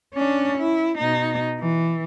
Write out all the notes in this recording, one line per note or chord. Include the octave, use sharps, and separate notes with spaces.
C#4 D4
E4
B2 D#4
E3